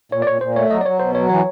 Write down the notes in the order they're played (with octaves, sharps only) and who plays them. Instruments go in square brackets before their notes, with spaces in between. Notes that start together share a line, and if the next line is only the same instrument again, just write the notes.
[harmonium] A#2 [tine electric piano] C#5
[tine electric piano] D5
[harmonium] A#2 [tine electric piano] C#5
[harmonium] A#2 [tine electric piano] C5
[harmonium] A3 [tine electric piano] C#5
[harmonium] F#3 [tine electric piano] D#5
[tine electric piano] D5
[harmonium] F#3 [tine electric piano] C#5
[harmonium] B2 [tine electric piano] C5
[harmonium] F#3 [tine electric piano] C#5
[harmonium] E3 [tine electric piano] C#5